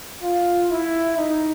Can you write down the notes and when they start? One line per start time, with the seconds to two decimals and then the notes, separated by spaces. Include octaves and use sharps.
0.22 F4
0.70 E4
1.17 D#4